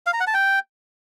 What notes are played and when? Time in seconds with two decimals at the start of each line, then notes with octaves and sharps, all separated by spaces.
0.06 F5
0.13 A#5
0.20 F#5
0.27 A5
0.34 G5